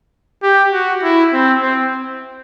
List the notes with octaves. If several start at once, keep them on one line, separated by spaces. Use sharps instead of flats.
G4
F#4
E4
C4
C4